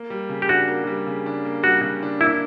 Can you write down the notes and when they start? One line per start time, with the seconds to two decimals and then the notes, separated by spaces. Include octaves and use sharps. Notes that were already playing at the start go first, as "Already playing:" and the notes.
Already playing: A#3
0.10 G3
0.29 C#3
0.42 G4
0.49 D4 F#4
0.68 A#3
0.87 G3
1.07 C#3
1.26 D4
1.45 A#3
1.63 G3 F#4
1.82 C#3
2.02 D4
2.21 A#3 E4